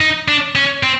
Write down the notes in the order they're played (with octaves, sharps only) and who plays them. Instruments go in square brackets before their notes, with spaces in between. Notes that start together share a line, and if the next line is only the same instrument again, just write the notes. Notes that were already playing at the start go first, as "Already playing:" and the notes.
[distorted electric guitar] D#4
D4
C#4
C4